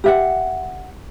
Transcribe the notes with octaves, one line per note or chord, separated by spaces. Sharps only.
G4 E5 F#5